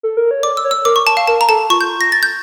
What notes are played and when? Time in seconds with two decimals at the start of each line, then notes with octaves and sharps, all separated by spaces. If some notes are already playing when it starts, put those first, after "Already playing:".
0.03 A4
0.17 A#4
0.31 C#5
0.43 D5 D6
0.57 E6
0.64 C#5
0.71 E6
0.85 A#4 D6
0.96 C#6
1.07 A5
1.17 F5
1.28 A#4 A5
1.41 A#5
1.49 A4 A5
1.70 F4 C#6
1.81 G6
2.01 A#6
2.12 A6
2.23 G6